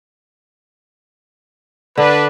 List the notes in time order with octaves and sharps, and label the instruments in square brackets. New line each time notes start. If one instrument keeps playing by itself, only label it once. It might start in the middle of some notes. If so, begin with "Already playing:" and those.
[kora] D3 [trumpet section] D4 B4